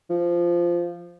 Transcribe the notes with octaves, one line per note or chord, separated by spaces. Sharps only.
F3